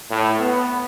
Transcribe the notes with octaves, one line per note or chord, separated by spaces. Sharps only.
A2
B3